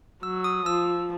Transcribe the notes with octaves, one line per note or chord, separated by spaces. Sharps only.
F#3 E6
D#6
F3 E6